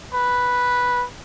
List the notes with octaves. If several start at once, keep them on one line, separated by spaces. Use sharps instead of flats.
B4